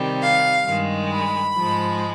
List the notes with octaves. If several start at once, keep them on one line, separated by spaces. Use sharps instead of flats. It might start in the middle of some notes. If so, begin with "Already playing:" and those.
Already playing: C3 D#3 G3
F5
G2 D#3 G#3
B5
G#2 F3 G#3